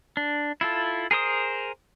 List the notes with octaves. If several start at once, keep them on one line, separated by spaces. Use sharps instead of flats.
D4
E4 F4 A4
G#4 A#4 C5 D#6